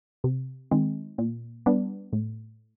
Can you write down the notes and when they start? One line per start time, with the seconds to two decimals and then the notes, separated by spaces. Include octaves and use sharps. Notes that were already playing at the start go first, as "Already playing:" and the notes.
0.24 C3
0.71 D#3 G#3 C4
1.18 A#2
1.66 G3 B3 D4
2.13 A2